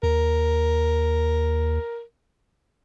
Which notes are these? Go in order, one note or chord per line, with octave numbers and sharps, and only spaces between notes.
D#2 A#4